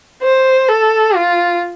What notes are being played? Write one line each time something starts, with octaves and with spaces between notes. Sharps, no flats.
C5
A4
F4